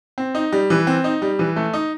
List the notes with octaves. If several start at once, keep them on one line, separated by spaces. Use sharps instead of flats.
C4
D#4
G3
E3
C4
D#4
G3
E3
A3
D#4